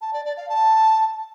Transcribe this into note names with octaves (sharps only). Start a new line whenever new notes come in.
A5
D5
D5
F5
A5